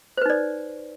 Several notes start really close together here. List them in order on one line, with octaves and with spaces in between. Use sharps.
C5 B4 D#4 D5